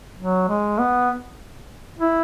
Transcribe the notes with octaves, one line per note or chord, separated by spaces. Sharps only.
F#3
G#3
B3
E4